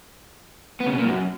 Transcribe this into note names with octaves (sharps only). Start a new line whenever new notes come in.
B3
C#3
B2
A#2
F#2